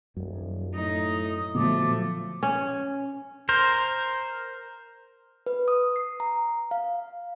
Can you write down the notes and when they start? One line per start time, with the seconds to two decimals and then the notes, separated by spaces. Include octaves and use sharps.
0.17 D#1 F#2
0.74 A2 D#4 D#6
1.55 A#2 D3 F3 F#3 A3 B3 D6
2.43 C#4
3.49 A#4 C5
5.46 B4
5.68 D#6
5.96 C7
6.20 A#5
6.71 F5